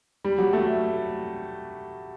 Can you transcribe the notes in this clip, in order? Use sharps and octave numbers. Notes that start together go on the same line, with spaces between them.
G3
F#3
A3